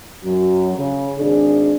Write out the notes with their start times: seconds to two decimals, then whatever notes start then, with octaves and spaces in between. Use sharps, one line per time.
0.23 F#2 F#3
0.77 C#3
1.19 G#1 D4 G#4